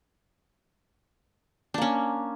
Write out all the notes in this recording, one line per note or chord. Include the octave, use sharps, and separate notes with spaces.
A#3 C#4 D4